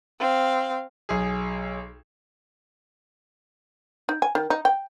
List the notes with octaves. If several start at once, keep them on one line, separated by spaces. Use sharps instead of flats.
C4 F5
B1 G#4
D#4
G#5
D#3
D#4
G5